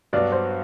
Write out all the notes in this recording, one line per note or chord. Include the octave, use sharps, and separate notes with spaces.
G2 F#3 B3 D4 F#4 D5
C5